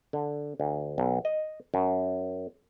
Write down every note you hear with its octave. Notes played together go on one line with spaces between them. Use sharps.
D3
D2
B1
D#5
F#2